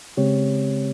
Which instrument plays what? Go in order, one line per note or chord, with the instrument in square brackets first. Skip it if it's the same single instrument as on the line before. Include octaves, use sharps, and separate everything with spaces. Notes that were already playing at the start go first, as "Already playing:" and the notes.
[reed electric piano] C#3 G#3 C4 G4 C#5